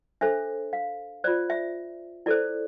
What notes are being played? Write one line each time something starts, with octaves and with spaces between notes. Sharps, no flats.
D4 A4 C5 E5
F5
F4 C5 D5
E5
E4 A4 C5 D5